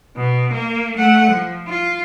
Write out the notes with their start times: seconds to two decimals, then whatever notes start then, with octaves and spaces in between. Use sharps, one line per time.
0.17 B2
0.54 A#3
0.97 A3 F#5
1.32 F3
1.68 F4